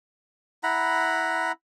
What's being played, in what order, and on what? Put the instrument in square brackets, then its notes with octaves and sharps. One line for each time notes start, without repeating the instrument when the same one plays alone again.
[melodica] E4 F#5 A#5 B5